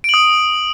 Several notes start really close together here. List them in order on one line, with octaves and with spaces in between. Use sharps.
D7 F#7 D#6